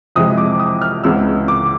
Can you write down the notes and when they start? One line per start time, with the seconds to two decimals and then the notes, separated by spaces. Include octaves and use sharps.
0.16 F2 C3 E3 G#3 D#6
0.38 D6
0.59 D#6
0.82 F6
1.04 C#2 C#3 E3 G#3 B3 E6
1.48 D6